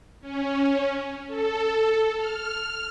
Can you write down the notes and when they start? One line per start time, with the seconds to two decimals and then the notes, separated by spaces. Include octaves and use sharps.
0.21 C#4
1.28 A4
2.17 F6